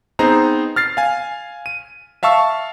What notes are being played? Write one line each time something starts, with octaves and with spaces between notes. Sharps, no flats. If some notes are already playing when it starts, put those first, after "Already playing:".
B3 C4 D#4 G#4 C5 A#5
F6 A6 C7
F5 G#5
D#7
E5 F5 A5 C#6 E6